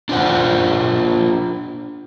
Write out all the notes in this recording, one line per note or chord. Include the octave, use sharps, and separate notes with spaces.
D4 F4 C5 F#5